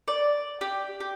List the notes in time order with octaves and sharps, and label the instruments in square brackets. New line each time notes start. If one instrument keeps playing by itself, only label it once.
[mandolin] D5
G4
G4